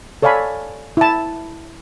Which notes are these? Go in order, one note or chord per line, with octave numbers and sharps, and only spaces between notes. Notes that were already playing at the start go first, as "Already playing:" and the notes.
A4 C#5 D5 F5 G#5 B5
E4 A5